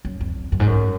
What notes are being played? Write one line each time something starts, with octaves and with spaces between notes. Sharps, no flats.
F#2
F2
F#2
F#2
G#2
F#2